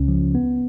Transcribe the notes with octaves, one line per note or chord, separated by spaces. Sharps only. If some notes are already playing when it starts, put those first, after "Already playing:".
Already playing: C#2 C#3 C#4
F3
B3